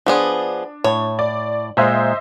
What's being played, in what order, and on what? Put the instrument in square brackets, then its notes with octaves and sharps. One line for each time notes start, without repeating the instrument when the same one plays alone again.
[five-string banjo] F3 B3 G#4 [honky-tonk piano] D4
[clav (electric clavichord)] A2 [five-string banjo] C#5
[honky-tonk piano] D5
[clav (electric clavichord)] A#2 G#3 [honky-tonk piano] C5 D#5 E5